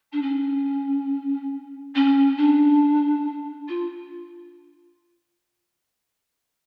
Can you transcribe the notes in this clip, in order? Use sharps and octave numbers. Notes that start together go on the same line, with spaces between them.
D4
C#4
C#4
D4
F4